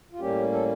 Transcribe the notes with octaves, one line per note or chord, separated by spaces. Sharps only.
F4
A2 G3 A#3 C#4 G4
A4